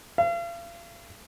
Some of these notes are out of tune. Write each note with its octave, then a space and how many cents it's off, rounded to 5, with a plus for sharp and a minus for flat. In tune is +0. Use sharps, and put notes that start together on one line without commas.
F5 -40